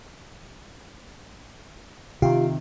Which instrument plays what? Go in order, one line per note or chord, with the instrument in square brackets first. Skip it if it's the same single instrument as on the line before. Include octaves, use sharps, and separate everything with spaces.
[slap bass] C3 D#3 [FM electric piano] F4 G4 F5